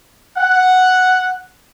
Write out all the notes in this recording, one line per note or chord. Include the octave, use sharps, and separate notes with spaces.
F#5